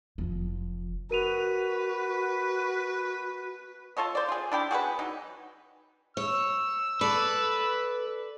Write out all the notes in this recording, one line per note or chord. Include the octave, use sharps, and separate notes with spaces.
F1 F3
F#4 A#4 B4 D#7 F7
F4 A4 C#5 D#5
C5 D5
F4 G#4
D4 E4 G4
F#4 G#4 A#4 B4
E3 F#3 D#4
C#5 E6
A4 B4 D5